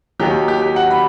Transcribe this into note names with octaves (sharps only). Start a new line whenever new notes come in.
D#2 D#3 F#3 G4
G4
G4
F#5
B5